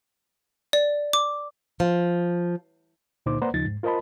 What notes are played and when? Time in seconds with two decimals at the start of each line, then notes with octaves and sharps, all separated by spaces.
0.73 D5
1.13 D6
1.80 F3
3.26 C#2 A#2 D3 D#4 C5 D6
3.42 A#3 B4 C5 D5 F#5 A#5
3.54 D#2 C#3 F3 D#4 A6
3.65 G#2
3.83 F4 A#4 C5 D#5 A5 B5